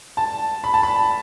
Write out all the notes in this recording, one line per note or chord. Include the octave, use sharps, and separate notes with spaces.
A5
B5
A5
B5